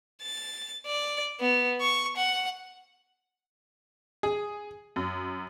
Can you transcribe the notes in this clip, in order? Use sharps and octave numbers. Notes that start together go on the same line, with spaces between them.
A6
D5
B3
C#6
F#5
G#4
F#2